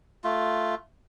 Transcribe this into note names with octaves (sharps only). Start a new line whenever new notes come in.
A3 F4